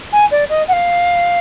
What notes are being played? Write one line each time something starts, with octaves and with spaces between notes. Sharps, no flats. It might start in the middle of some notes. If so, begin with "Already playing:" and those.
G#5
D5
D#5
F#5
F5